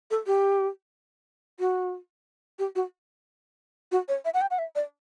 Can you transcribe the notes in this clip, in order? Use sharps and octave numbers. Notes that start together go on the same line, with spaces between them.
A4
G4
F#4
G4
F#4
F#4
C#5
E5
F#5
G5
F#5
E5
D5